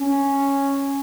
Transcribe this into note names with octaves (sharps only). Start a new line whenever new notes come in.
C#4